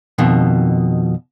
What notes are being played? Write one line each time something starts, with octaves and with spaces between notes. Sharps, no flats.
F2 B2 D#3